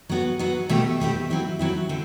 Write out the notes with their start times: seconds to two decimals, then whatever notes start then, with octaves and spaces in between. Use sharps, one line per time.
0.09 F#3 B3 F#4
0.39 F#3 B3 F#4
0.69 B2 A3 C4 G4
1.00 B2 A3 C4 G4
1.30 F#3 C4 E4
1.59 F#3 C4 E4
1.89 D3 C4